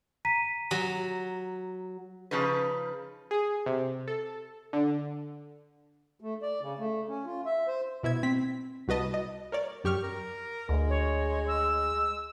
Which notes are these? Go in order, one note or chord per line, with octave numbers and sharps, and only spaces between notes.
A#5 B6 D#7
F#3
C#3 F3 D#4 B4
G#4
C3
A4
D3
A3
D5
C#3
A3
C#4
F4
E5
C5
B2 E4 E5 G#6
C4 B6
C2 F#4 B4 D#5 A5
D#5
A#4 C#5 D5
F#2 G4 C#6 F6
A#4
D2 G#3
C#5
E6